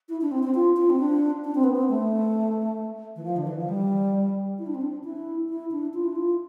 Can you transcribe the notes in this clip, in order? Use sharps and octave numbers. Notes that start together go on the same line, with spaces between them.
E4
D4
C4
C4
F4
F4
C4
D4
D4
C4
B3
C4
A3
E3
F3
D3
E3
F3
G3
E4
D4
C4
D4
E4
E4
D4
F4
E4
F4